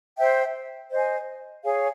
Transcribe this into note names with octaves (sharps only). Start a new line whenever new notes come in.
C5 E5 G5
C5 D#5 G#5
G#4 C#5 F5 G#5